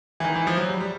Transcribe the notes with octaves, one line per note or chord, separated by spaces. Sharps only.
E3
D#3
E3
F3
F#3
G3
G3